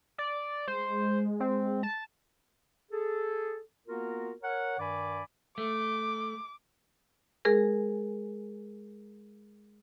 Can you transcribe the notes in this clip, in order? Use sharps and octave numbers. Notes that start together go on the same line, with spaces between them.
D5
G#3 C5
C4
A5
G#4 A4
A#3 B3 F4 F#4 A#4
A#4 C#5 F#5
G2 D#3 D5 G#5 B5 D6
A3 D6
G#3 G#4 A#4